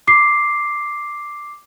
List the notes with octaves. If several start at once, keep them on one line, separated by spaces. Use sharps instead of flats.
D6 C7